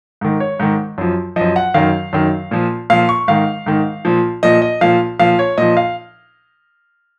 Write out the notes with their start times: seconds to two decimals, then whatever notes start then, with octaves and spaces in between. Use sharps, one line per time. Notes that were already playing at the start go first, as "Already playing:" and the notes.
0.21 G#2 D#3
0.40 C#5
0.60 G#2 D#3
0.98 F#2 F3
1.36 F#2 F3 D#5
1.56 F#5
1.74 F#2 D#3 F5
2.13 F#2 D#3
2.51 A#2 F3
2.90 A#2 F3 F5
3.09 C#6
3.28 G#2 D#3 F5
3.66 G#2 D#3
4.05 A#2 F3
4.43 A#2 F3 D#5
4.62 D#5
4.81 A#2 F3 F5
5.19 A#2 F3 F5
5.39 C#5
5.58 A#2 F3 D#5
5.77 F5